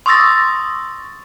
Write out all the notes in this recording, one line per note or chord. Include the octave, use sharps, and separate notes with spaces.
C6 C#6 D#6 E6 A6 A#6